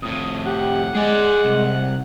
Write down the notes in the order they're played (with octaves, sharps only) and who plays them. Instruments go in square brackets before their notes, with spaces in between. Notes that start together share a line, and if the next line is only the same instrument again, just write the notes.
[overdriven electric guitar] F2 A2 [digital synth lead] D#6
[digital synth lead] G4 [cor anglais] F#5
[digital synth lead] G#3 [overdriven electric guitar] G#4 D5
[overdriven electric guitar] C2